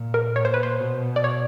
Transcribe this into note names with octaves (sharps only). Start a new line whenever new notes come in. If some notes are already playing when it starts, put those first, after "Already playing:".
Already playing: A#2
A#4
A#2 C#5
C5
B4
C5
B2
D5
C#5